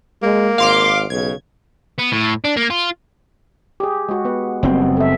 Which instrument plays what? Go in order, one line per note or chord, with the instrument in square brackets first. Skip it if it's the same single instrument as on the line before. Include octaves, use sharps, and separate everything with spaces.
[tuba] G#3 [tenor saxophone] A#3
[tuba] G#1 [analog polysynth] F5 C6 D6
[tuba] B1 [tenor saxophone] C#3 [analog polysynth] G#6
[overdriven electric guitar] B3
A2
D4
A#3
F4
[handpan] G4 G#4
G#3 F#4
B3 B4
[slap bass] F#1 C4 [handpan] G3 B3
[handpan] A4 E5